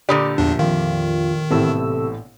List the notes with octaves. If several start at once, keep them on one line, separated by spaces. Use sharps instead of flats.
A#2 D3 G4 D5 B5 D#6
A#1 E2 D4
F2 D#3 F4
A1 A2 C3 B3 A4 E6